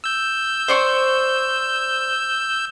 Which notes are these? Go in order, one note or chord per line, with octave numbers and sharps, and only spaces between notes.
E6 G6
C5 D5 C#6